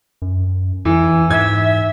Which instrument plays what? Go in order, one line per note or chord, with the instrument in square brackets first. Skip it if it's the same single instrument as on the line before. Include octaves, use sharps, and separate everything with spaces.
[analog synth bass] F#2
[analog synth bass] F2 [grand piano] E3
[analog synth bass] G#2 [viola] E5 [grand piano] G#6